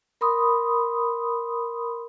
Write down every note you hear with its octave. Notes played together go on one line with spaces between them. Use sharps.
A#4 B5 C6 D#6